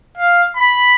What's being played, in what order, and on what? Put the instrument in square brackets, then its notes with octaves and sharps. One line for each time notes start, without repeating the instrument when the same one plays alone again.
[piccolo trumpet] F5
B5